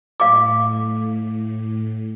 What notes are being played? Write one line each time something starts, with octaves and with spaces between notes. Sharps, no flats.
A2 F5 D6